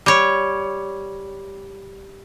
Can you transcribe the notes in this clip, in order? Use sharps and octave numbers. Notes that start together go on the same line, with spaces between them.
G3 C#5